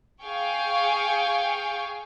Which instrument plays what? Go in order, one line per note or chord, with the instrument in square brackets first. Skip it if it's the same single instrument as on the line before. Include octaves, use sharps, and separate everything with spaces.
[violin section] G#4 F5 G5 G#5 C#6